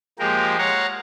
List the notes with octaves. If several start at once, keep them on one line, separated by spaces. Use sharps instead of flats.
F3 G#3 A#3 G4 A#4
C#5 F5 F#5 A#5